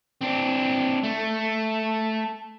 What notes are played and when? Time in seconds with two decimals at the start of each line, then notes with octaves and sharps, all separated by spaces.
0.21 C4 D4
1.03 A3